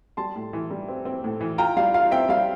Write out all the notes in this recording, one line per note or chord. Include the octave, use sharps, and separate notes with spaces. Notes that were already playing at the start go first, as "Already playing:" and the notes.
G3 A5 C6
A2
E3
G3
C4
C4
A2
E3
F4 G5 A#5
G3 F5
F4 F5
C4 E5 G5
G3 F5